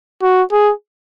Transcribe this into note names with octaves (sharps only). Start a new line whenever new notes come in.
F#4
G#4